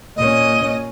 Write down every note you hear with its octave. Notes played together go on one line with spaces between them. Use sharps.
A#2 C#4 D#5